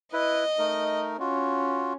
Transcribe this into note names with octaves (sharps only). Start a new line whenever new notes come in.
E4 B4 D#5
A3 D#4 A#4
C#4 F4 F#4